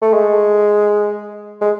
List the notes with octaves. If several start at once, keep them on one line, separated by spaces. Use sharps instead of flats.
A3
G#3
G#3